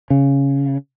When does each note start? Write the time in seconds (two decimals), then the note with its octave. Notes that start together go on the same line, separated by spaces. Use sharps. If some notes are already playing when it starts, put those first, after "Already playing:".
0.10 C#3